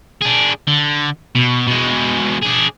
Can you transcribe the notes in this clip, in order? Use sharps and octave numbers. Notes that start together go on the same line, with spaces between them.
D4 G#4
D3
B2
B2 G#3
D4 G#4